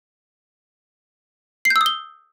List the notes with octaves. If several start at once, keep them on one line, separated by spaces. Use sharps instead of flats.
C7
G6
E6
D#6
G7